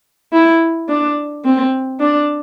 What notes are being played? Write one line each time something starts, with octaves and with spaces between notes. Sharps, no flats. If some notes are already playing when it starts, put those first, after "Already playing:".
E4
D4
C4
D4